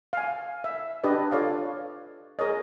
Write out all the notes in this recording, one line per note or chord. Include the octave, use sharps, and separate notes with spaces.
F5 G#5
E5
D4 G4 B4 D5 D#5
F4 A4 C#5 D5 F5
G#4 A#4 C#5 D#5